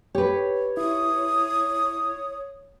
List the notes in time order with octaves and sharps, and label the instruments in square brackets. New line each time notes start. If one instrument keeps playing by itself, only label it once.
[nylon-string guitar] G4 B4 [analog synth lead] C#5
[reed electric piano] E4 [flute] D#6